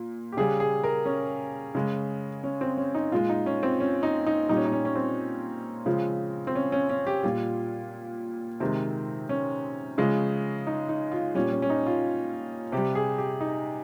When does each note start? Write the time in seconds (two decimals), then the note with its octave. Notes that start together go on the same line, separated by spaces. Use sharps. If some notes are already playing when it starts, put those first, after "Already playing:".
Already playing: A#2
0.32 G4
0.37 C#3 G3 G#4
0.60 G#4
0.84 A#4
1.05 C#4
1.75 C#3 G#3
2.44 C#4
2.61 C4
2.77 C#4
2.95 D#4
3.12 A#2 G#3 F4
3.29 D#4
3.46 C#4
3.63 C4
3.80 C#4
4.03 D#4
4.27 D#4
4.49 A#2 G3 D#4
4.57 C#4
4.65 D#4
4.72 C#4
4.85 C#4
4.95 C4
5.86 C#3 F3 G#3
6.47 C4
6.55 C#4
6.72 C#4
6.89 C#4
7.07 G4
7.23 A#2 G3 F4
8.60 C3 D#3 G#3 C4
9.29 C#4
9.98 C#3 F3 G#3
10.67 D#4
10.89 D#4
11.12 F4
11.35 A#2 G3 C#4
11.52 C#4
11.62 C#4
11.70 D#4
11.87 F4
12.72 C3 G3 G4
12.95 G#4
13.18 G4
13.41 D#4